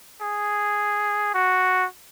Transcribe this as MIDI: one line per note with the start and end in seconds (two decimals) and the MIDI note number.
0.22 1.34 68
1.35 1.86 66